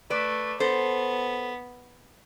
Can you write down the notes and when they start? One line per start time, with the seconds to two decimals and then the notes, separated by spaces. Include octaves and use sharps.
0.10 A3 B4 D5
0.60 B3 A4 C5